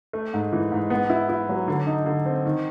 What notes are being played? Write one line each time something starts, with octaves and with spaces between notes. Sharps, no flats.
A3
G#2
E3
G#2
B3
E4
E4
F#3
D3
D#4
D3
C4
D#3